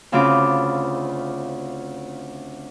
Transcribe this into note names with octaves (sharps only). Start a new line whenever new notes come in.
D2 C#3 C4 F4 B5 D6